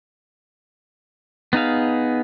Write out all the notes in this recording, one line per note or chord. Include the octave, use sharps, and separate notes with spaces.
B3 D#4 G#4 F5